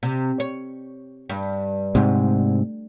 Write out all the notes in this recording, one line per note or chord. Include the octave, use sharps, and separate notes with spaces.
C3
C#5
G2
D2 G#2 C3